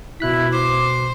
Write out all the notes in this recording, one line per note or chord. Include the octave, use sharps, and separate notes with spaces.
B2 E4 F#6 B6
C5 D6